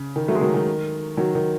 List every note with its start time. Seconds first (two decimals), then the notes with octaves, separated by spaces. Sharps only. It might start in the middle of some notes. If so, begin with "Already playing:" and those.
Already playing: C#3
0.16 D#3
0.28 F#3 A3
0.35 G#3
0.41 D#3 F#3
0.54 D#3
1.17 D#3 F#3
1.35 D#3